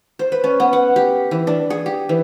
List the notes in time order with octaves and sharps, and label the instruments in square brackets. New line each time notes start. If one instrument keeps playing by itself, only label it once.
[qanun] C5
B4
C#4
B3
F#5
G4
E3
D4
G#4
G4
E3